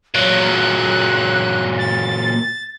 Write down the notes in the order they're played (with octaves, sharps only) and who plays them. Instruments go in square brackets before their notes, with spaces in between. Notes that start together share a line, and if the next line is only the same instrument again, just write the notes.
[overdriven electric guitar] A#2 F#3 [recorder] F#6
[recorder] A6